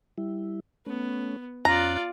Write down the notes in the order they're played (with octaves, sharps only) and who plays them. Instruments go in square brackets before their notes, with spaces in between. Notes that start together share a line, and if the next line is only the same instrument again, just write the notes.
[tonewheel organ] G3 E4
[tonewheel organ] A3 C#4 [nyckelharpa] B3
[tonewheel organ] F2 C#4 F#6 [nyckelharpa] F4 D5 [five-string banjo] A#5